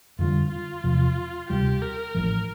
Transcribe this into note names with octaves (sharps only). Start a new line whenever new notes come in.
F2 D3 G3 F4
F4
E2 C3 F3
D2 C3 G3 G4
A#4
A1 A2 F3